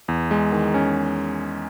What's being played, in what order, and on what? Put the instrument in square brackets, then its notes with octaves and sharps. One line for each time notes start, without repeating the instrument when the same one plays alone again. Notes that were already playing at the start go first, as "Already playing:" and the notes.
[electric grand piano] E2
G#3
D#3
C#4